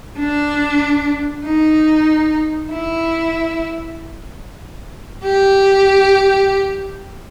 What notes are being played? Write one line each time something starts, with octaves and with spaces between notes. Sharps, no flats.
D4
D#4
E4
G4